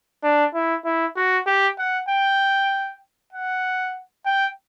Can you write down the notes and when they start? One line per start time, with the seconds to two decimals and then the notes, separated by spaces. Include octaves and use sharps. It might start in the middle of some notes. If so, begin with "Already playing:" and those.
0.23 D4
0.54 E4
0.85 E4
1.17 F#4
1.47 G4
1.79 F#5
2.09 G5
3.33 F#5
4.26 G5